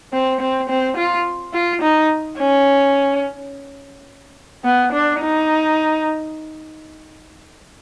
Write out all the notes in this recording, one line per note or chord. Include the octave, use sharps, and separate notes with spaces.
C4
C4
C4
F4
F4
D#4
C#4
B3
D4
D#4